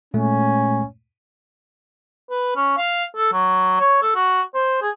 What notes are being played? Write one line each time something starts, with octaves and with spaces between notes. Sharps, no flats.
A#2 G#3 A3 C#4
B4
C#4
F5
A4
F#3
C#5
A4
F#4
C5
G#4